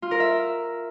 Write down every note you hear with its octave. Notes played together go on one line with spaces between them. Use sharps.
F4
A#4
E5